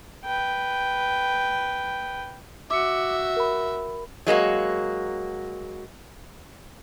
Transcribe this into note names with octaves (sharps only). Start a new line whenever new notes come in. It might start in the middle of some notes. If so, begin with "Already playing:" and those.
B4 G5
F#4 E5 D6 C#7
A#4 B5
F#3 G#3 A#3 F#4